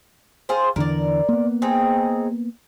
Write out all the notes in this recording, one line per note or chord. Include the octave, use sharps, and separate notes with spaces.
F4 G#4 C5
E2 D3 E3 A#4 D5
A#3 B3
C4 D#4 G#4